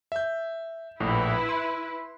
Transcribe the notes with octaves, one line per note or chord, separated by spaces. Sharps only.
E5 G6
A#1 A2 E4 B4
C6